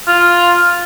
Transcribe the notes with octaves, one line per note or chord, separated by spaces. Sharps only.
F4